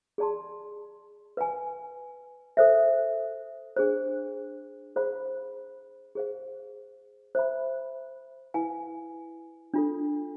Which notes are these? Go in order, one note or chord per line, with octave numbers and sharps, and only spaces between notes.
G#4 D5 A5 C6
B4 F5 G#5
A4 C5 E5
D4 G#4 C5
G#4 C5 F5 B5
G#4 C5 F5
C5 E5 B5
E4 B4 F5 G#5
D4 F4 A4